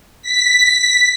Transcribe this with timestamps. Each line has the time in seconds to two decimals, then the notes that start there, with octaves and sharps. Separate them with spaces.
0.22 B6